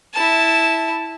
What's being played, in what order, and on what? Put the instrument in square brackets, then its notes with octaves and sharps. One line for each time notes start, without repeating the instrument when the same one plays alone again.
[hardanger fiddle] E4 A5